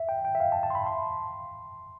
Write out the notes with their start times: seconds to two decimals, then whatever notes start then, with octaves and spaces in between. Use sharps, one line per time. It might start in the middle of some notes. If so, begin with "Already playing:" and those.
Already playing: E5
0.09 G5
0.25 G5
0.35 E5
0.40 F5
0.52 A5
0.63 A5
0.70 C6
0.75 B5
0.86 C6